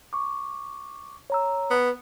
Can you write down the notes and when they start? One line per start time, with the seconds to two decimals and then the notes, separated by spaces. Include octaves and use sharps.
0.13 C#6 D6
1.30 C#5 A#5 E6
1.70 B3